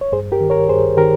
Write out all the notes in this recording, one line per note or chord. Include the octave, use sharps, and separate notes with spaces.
C#5
G2 G#4 C5
G4 A#4
D#3
A#4 C#5
G2 G#4 C5
D#3 G4 A#4